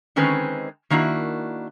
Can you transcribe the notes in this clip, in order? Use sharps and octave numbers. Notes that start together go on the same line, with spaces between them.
D3 D#3 G#3 C4 C#4 B4
D#3 A#3 D4 E4 F#4